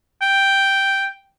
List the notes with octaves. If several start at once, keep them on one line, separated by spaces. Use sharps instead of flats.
G5